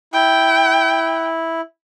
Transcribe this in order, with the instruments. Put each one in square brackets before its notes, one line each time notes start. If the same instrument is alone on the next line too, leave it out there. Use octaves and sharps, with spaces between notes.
[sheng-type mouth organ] E4 [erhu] G5